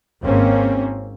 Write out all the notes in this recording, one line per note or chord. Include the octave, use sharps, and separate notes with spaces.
G#1 A#3 C4 C#4